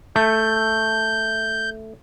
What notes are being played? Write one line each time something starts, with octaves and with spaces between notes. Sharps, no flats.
A3 G6